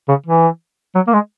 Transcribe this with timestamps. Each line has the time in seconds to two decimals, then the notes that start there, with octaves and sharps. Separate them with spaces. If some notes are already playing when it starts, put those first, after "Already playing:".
0.08 C#3
0.26 E3
0.95 F#3
1.07 A#3
1.13 G#3